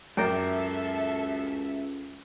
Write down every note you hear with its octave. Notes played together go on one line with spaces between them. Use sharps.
C#2 F#2 A4 A#4 D5 E5 G5